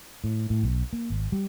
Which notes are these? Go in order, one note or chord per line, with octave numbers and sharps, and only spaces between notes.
A2
A2
B1
A#3
G#1
G3